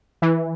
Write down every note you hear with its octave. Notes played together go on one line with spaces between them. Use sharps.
E3